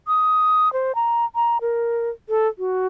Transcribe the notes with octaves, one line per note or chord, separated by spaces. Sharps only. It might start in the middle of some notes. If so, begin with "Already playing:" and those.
D#6
C5
A#5
A#5
A#4
A4
F#4